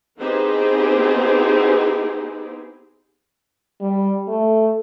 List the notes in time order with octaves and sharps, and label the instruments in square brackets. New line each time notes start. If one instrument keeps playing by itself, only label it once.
[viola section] B3 C4 D#4 E4 G4 G#4
[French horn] G3
A3